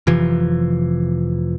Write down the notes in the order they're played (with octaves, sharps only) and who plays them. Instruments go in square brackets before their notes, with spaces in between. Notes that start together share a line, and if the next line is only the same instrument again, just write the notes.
[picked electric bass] F1 C3 E3 F3